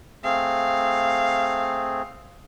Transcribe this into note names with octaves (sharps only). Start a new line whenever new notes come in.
A3 C4 G#4 F5